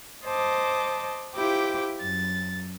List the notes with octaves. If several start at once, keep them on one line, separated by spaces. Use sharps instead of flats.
C5 D#5 A5 D6
E4 F4 G4 C5 G5 D6
F#2 A6